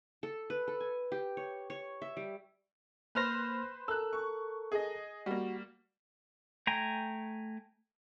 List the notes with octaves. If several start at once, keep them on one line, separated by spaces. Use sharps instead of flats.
A4
B4
A4
G#5
G4
C#5
C#5
E5
G3
A#3 B4 C5 F6 A#6
A4 A#4 E6 F#6
C#6
G#4 D#5
G3 A#3 F#4
A3 G5 G#5 A#5